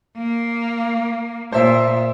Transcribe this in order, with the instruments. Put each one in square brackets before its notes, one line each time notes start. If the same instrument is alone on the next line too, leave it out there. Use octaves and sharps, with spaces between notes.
[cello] A#3
[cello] A#2 [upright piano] C5 E5